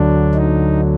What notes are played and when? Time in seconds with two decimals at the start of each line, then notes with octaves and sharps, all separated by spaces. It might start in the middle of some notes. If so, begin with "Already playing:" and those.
Already playing: D2 D3 F#3 D4
0.34 D#4